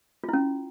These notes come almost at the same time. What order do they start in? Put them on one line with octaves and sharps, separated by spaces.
F4 E4 C#4